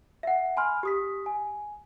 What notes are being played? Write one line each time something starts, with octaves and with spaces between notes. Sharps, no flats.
E5 F#5
G#5 B5 C6 F6
G4 D#6 B6
G#5